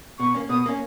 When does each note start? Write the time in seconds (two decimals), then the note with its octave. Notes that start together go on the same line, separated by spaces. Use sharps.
0.20 B2 C#6
0.34 A#3 C#4
0.50 B2 D#6
0.66 A#3 C#4